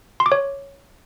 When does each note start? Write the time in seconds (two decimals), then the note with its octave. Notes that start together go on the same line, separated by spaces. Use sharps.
0.20 C6
0.26 D6
0.32 C#5